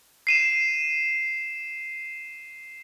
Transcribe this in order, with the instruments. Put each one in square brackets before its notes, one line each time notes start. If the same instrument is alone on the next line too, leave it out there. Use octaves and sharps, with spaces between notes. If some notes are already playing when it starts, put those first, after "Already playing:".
[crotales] C7 D#7 E7